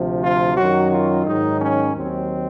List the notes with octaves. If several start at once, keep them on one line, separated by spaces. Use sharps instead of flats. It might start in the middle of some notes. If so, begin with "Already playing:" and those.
Already playing: D2 C3 F3
F4
F#2 D#3 F#3 F#4
F4
G#2 D#3 F#3 D#4
C#4
D#2 D#3 F#3 C4